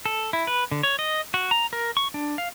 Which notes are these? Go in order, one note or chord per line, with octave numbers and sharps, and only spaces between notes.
A4
E4
B4
D3
C#5
D#5
F#4
A#5
A#4
C#6
D4
F5